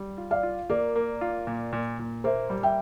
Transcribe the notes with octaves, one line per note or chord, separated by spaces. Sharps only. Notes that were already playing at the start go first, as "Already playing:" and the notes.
Already playing: G3
F4
D5 F5
F4
A#3 A#4 D5
A#3
F4
A#2
A#2
A#2
A#3 C5 E5
G3
E5 G5